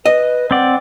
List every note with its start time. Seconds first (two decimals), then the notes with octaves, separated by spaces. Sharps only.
0.06 B4 D#5
0.51 C4 D5 F#5